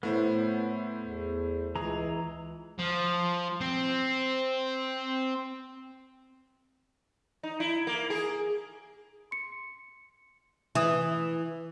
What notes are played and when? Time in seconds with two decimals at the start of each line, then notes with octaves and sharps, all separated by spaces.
0.03 A2 A3 B3 E4 C5
1.02 E2
1.75 C#2 E3 G#4 A#5
2.79 F3
3.61 C4
7.43 D#4
7.60 E4
7.87 A#3
8.10 G#4
9.31 C6 C#7
10.75 E3 E5 D#6